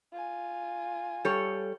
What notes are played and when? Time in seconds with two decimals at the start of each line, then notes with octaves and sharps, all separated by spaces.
0.12 F4 G#5
1.25 G3 A4 C#5